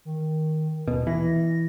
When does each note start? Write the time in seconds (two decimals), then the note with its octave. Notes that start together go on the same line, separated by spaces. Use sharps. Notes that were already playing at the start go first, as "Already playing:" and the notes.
0.05 D#3
0.88 D#1 B2
1.07 E3 A#6